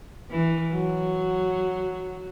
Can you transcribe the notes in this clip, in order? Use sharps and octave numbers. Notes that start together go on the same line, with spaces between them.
E3
F#3